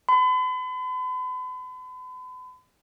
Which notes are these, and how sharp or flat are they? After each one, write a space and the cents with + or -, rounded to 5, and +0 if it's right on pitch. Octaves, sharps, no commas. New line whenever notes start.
B5 +45